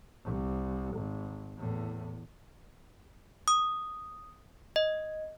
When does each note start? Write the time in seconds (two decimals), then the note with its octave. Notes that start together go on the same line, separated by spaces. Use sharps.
0.25 C2
0.95 G#1
1.57 E2 A2
3.48 D#6
4.76 D#5